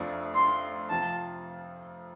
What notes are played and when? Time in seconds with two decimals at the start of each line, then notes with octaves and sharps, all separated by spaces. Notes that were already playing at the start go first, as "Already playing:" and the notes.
Already playing: F1 F2 F3 A3 D4
0.35 C6
0.90 F2 C3 F3 C4 F4 A5